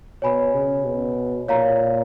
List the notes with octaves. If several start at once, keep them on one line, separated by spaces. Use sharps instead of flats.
B2 C#5 G#5 B5
C#3
B2
A#2 C#5 F5 A#5